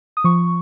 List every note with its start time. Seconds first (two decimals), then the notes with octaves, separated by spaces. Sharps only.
0.17 D#6
0.24 F3 C#6